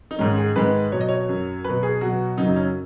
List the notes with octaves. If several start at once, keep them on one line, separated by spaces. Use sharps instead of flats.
D#4
G#2 D#3 G#3 C#4
G#4
G#2 D#3 G#3 B4
B2 F#3 C#5
D#5
C#5
F#2 F#3
B2 F#3 B4
G#4
B2 F#3 F#4
F#2 C#3 F#3 D#4
C#4